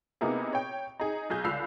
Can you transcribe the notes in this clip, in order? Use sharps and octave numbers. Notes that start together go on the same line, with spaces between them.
C3 A#3 B3 D#4 E4 G#4
C#5 G5
D#4 G#4
B1 G#4 G6
C#2 D3 B5 E6 C7 F7